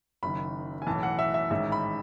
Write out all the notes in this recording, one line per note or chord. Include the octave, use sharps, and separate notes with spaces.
F#1 F#2 D#3 B5
G#5
B1 A2 E3 A5
F#5
E5
E5
A1 G#2 D#3 E5
B5